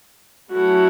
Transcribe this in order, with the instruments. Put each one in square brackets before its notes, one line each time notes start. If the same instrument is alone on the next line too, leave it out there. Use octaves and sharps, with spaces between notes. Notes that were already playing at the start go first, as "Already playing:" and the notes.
[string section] F#3 A3 C#4 E4 A4 [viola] F#4